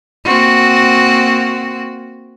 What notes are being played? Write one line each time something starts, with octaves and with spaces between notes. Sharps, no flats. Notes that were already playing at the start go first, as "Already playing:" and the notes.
A#3 C4 F#4